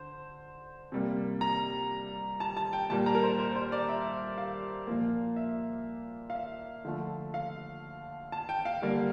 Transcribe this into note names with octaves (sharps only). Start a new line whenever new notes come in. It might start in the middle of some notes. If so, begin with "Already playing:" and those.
Already playing: D3 C5
C3 G3 A#3
A#5
A5
A5
G5
A#2 G3 A#3 A5
A#5
A#4
C5
C5
C5
D5
E5
F5
A#2 F3 A#3
E5
F5
E5
D3 F3 A3
F5
A5
G5
F5
D3 G3 A#3